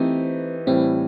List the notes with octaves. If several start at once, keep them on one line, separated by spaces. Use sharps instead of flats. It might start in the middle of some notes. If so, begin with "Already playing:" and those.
Already playing: E3 A3 C4 D#4 G4
A2 E3 G3 C4